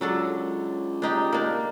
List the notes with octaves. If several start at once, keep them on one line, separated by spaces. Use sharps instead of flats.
C#2 F#3 D4 A4
D4 D#4 G4
A#3 D4